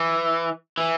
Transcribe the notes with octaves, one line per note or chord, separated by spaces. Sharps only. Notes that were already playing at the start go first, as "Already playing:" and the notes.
Already playing: E3
E3